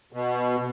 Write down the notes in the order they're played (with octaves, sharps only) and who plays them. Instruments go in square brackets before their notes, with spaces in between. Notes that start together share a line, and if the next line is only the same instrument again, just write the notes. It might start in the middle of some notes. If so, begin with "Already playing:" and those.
[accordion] B2